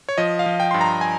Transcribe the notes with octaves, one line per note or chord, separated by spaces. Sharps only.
C#5
F3 D#5
F5
F3
G5
G2 C6
A#5
G#5